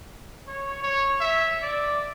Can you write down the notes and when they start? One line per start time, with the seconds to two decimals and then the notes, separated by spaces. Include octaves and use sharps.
0.47 C#5
0.83 C#5
1.20 E5
1.62 D5